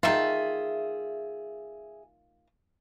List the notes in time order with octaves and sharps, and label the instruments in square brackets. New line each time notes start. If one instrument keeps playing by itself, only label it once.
[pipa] D#3 A3 F4 [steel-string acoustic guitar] G#4 E5